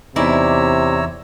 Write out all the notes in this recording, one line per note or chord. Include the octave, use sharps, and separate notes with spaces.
E2 C3 D#4 E4 C#5 D5 A#5 E6